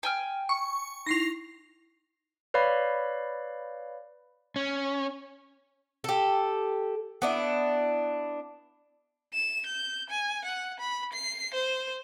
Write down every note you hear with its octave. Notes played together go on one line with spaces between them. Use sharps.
G5 G#5 F6
C#6
D#4 E4 A#6 C7 F7
B4 C#5 D5 F5 B5
C#4
G4 A4
B3 D4 E4
E7
G6
G#5
F#5
B5
C7
C5